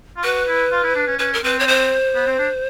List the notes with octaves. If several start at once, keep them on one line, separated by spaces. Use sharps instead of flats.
F4
F#4 B4
E4
F4
E4
D4
C#4
C#4 B4
A#4
C4 B4
C#5
C5
B3
C4
D4